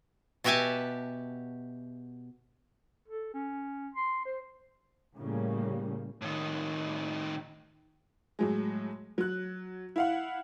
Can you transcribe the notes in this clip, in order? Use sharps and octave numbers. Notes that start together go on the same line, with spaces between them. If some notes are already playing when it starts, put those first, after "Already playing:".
B2 F#4 G4 E5 G#5 A5
A4
C#4
C6
C5
A2 C#3 G3 A#3
A2 D#3
A2 F#3 G#3
F#3 F#6
E4 F5 F#5